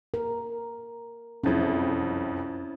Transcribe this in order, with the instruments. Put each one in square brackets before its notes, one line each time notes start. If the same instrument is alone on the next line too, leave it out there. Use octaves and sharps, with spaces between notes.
[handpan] A#4
[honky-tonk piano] F#1 C2 F2 [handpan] C#4 E4